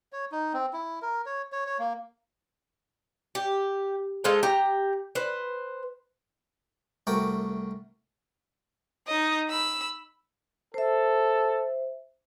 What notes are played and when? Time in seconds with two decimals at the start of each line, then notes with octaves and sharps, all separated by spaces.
0.13 C#5
0.32 D#4
0.53 C4
0.73 E4
1.02 A#4
1.26 C#5
1.52 C#5
1.67 C#5
1.79 A#3
3.35 G4
4.24 G#3 F4 A4 C5
4.43 G4 A#5
5.15 B4 C5
7.07 C2 A3 F#4 A#4 G5 D6
9.07 D#4 D#5
9.50 B5 E6
10.74 A4 C5 E5